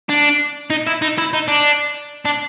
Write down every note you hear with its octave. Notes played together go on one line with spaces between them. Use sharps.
D4
D#4
E4
D#4
E4
D#4
D4
D4